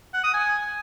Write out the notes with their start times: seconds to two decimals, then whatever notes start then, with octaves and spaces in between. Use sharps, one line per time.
0.14 F#5
0.24 D#6
0.34 G#5